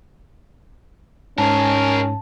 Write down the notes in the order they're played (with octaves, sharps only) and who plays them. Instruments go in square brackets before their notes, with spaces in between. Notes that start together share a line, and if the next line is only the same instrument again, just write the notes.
[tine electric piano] G#2 [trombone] C#4 [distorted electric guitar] G#4 A#4 [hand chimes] A5